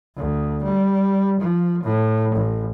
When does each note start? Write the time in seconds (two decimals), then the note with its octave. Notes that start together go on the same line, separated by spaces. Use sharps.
0.16 D2
0.64 G3
1.40 F3
1.83 A2
2.35 A1